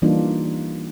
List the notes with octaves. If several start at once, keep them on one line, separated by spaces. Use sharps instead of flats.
E3 G3 A#3 D4 D#4 F4